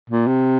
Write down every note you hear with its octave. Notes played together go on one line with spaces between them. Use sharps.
A#2
C3